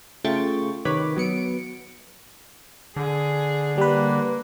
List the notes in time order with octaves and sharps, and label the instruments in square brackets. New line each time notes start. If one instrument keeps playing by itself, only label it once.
[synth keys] C#3 A3 F4 G5 C#6 A6
C3 D#3 B4 C#5 B5 D6
F#3 B3 C#7 D7
[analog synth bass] D3 [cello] G#4
[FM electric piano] G3 B4 [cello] A#3